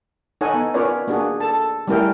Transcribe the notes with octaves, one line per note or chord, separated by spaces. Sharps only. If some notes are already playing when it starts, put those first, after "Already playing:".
D#4 A4 C#5 D#5 F#5 G#5
B3
C#4 F4 A#4 B4 C#5 D5
A#3 D4 F#4 G#4
A4 A5
G3 A3 C#4 E4 A#4 G5